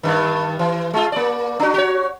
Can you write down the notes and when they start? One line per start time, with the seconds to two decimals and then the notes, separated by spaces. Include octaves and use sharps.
0.03 G2 D#3
0.59 E3
0.93 G#3 F4
1.12 A#3 D5
1.60 D4 F#4
1.74 F#4 C#5